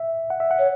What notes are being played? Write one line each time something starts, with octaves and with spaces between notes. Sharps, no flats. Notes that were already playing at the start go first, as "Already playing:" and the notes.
Already playing: E5
F#5
E5
F#5
C#5